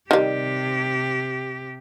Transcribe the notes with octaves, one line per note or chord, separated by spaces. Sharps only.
C3 D#3 G3 G4